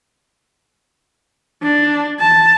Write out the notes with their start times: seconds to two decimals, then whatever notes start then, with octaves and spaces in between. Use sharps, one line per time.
1.62 D4
2.20 A5